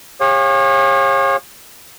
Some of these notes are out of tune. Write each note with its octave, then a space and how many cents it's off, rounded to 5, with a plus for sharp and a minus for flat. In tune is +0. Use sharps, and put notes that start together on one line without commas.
G4 +45 C#5 -30 F5 +25